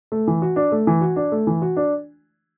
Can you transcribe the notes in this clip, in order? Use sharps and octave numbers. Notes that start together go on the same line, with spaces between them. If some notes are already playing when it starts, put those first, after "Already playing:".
A3
E3
F#4
D4
A3
E3
F#4
D4
A3
E3
F#4
D4